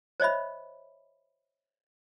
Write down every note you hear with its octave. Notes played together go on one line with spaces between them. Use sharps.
C5 C#5 D#5 E5 B5